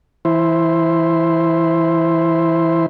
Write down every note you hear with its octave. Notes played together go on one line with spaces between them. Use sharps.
E3 E4 C5